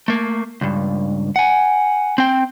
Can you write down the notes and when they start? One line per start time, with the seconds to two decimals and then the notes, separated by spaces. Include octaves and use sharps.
0.08 A3 A#3
0.61 C#2 G2
1.36 F#5 G#5
2.18 C4 G5